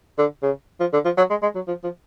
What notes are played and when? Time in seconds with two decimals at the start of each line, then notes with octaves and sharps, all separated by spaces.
0.18 D3
0.42 C#3
0.80 F3
0.93 D3
1.05 F3
1.17 F#3
1.30 G#3
1.42 G#3
1.55 F#3
1.67 F3
1.84 F3